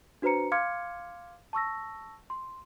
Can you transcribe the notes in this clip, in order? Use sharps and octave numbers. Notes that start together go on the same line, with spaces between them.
D4 F#4 B4 C5 A#5 C#7
F5 C6 D6 F6 G#6 C#7
A5 C#6 E6 A#6
C6